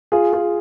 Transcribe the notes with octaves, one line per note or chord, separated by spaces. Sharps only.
F4 G#4
F4 G#4